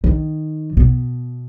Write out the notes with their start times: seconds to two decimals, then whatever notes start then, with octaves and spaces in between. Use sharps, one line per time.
0.04 D#3
0.77 B2